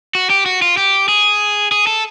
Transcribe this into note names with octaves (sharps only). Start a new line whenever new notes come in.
F#4
G4
F#4
F4
G4
G#4
G#4
A4